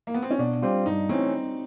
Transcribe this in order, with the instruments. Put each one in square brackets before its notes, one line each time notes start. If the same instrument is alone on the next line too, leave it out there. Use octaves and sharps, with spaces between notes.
[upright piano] A#3
B3
C4
C#4
[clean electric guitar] B2 [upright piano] D4
[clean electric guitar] G3 C4 F4
[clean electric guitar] G2 [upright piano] D#4
[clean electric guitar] E3 A3 C#4 [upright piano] C4